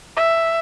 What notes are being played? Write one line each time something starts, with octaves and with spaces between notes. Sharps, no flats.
E5